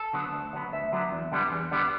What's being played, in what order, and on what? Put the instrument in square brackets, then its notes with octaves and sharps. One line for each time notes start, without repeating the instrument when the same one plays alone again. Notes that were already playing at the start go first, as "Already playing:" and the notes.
Already playing: [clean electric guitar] A4
D3 F#3 B3
D2
D3 F#3 B3
D2 E5
D3 F#3 B3
E2
D3 G3 B3
E2
D3 G3 B3